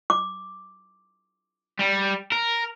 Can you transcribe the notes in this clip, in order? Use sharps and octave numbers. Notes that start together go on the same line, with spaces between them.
D6
G3
A#4